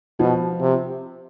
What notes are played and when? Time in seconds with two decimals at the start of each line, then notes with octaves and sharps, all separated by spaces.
0.20 B2 F3
0.61 C3